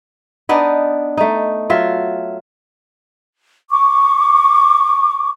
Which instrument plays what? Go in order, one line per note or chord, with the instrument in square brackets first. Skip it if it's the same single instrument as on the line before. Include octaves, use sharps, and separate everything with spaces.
[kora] B3 D4 D#4
A3 D#4
F#3 F4 E5
[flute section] C#6 D6